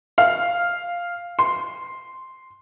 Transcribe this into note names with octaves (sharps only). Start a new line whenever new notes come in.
F5
C6